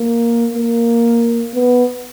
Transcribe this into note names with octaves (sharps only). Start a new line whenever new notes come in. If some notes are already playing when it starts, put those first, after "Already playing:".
Already playing: A#3
A#3
B3